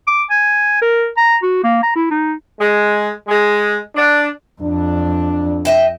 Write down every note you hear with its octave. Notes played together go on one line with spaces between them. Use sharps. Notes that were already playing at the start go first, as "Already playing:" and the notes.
D6
G#5
A#4
A#5
F#4
A#3
A#5
E4
D#4
G#3
G#3
D4
F2 D4
D#5 E5 G5